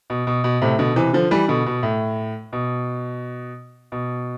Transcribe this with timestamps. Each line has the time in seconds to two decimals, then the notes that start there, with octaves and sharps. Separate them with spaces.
0.10 B2
0.27 B2
0.44 B2
0.61 A2 C3
0.79 B2 D3
0.96 C3 E3
1.13 D3 F3
1.31 E3 G3
1.48 B2 D3
1.66 B2
1.83 A2
2.53 B2
3.92 B2